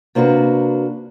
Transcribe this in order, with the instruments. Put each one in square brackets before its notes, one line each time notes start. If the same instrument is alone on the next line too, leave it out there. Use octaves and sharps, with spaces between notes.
[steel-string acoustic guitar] C3 A#3 D4 F#4 B4